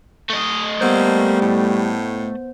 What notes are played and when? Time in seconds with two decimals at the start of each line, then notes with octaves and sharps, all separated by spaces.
0.30 A3 D#5
0.81 G3 A#3 B3 C5
1.41 A2